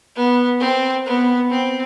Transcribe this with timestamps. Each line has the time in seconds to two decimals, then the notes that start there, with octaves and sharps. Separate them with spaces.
0.16 B3
0.60 C4
1.06 B3
1.50 C4